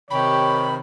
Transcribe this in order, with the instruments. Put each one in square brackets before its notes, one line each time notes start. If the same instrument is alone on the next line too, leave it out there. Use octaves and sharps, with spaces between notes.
[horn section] C3 D#3 [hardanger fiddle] G4 [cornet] C#5 [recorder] B5